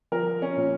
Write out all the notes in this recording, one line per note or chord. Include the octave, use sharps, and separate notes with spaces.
F3 A#4
C#4
A#2